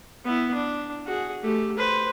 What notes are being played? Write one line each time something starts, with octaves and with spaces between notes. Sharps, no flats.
B3 E4
D4
F#4 G#4
A3 G4
B4 C5